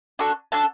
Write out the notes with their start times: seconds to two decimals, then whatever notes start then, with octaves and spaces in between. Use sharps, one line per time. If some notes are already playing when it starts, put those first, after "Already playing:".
0.19 D4 F#4 A4 C#6
0.52 D4 F#4 A4 A5